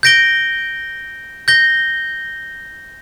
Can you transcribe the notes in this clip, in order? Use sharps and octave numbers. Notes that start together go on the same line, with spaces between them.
G6 A#6 D7 G7
G6 A#6 G7